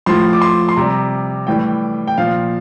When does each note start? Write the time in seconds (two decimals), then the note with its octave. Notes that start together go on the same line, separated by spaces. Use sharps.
0.06 A2 F3 C6
0.33 D6
0.42 C6
0.69 C6
0.77 C3 G3 A#5
1.47 A2 E3 G3 G5
2.08 G5
2.18 A#2 F3 F5